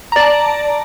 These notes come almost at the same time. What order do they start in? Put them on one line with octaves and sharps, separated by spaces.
A#5 D5 A5